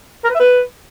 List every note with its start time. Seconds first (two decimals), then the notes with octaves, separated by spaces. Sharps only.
0.24 A#4
0.29 B4
0.35 E5
0.40 B4